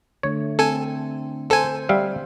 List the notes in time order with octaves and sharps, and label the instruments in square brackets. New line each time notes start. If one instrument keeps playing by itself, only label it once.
[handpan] D3 A3 [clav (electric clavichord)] C#5
[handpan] C4 [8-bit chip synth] A4 G#5
[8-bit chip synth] A4 G#5 [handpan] C5
[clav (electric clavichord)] G3 E5 F5